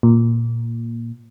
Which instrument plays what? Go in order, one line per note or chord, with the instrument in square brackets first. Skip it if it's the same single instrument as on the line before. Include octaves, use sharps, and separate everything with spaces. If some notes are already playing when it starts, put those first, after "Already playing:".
[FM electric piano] A#2